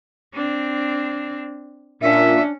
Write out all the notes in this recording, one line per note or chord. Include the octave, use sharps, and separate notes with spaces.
C4 D4
A#2 C#4 D4 E5